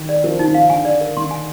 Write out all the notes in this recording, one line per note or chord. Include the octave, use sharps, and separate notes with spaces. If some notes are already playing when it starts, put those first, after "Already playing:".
Already playing: D#3
D5
F3 A#4
F3 D#4
D#3
F5
D3 G#5
D5
A#4
D#3 C6
G#5